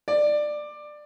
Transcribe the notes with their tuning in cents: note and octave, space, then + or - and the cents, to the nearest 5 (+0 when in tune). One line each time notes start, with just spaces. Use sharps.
D5 +15